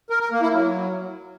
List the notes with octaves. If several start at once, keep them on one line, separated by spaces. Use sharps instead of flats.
A#4
A#4
A#3
E4
F#3